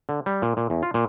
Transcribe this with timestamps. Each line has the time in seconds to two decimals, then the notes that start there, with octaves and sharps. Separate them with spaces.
0.09 D3
0.26 G3
0.42 A#2
0.57 A#2
0.70 E2
0.83 F4
0.94 A#2